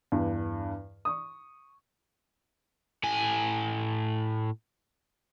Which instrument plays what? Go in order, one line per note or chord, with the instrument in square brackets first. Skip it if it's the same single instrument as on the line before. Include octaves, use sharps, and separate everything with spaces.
[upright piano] E2 G2
C#6 D#6
[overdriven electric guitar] A2 G#5